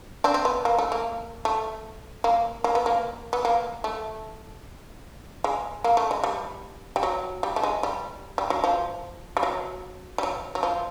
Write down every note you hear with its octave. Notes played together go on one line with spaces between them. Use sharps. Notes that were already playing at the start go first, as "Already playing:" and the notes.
C4 D4
C4
B3
A#3
A3
A#3
A3
A#3
A#3
B3
A#3
B3
A#3
A3
G#3
A#3
A3
G#3
G3
G3
F#3
G3
A3
G#3
G3
G3
F#3
F3
G3
F#3
G3
F#3
F#3
F3